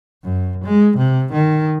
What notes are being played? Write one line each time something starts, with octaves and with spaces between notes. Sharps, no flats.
F#2
G#3
C3
D#3